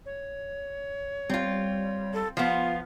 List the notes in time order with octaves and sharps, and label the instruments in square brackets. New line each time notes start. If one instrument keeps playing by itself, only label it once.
[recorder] C#5
[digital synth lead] G3 [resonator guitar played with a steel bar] C4 F4
[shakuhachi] A4
[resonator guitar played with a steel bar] F3 B3 [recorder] F4 [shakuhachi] F5